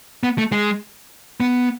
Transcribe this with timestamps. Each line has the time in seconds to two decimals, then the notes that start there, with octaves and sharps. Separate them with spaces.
0.23 B3
0.38 A3
0.52 G#3
1.40 B3